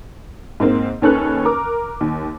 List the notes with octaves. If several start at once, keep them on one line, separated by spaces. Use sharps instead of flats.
G#2 A#3 C4
D#2 D#3 C#4 A4 B4 F#6
A#4 D6
D#2